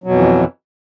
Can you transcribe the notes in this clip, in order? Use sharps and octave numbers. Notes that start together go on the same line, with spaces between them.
F2 B2 E3 F#3